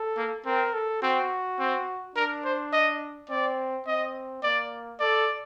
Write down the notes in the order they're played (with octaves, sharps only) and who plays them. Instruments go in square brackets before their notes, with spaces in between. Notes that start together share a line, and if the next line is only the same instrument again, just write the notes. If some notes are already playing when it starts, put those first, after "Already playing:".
Already playing: [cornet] A4
[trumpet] A#3
[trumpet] C4 [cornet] A#4
[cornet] A4
[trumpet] C4 [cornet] F#4
[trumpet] C4
[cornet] D4 [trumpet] A#4
[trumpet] C5
D#5
[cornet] C4 [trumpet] D5
[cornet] C4 [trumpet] D#5
[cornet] A#3 [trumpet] D5
[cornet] A4 [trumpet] D5